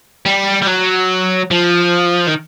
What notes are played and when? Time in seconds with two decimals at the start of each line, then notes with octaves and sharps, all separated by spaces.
0.26 G3
0.62 G3
0.66 F#3
1.51 F3
2.27 D#3